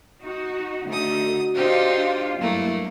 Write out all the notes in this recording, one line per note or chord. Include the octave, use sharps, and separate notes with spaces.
D#4 F#4
D3 A3 D#4 F#4 D#6
C4 D4 D#4 F4 G4
G2 F#3 A3 A#3 E4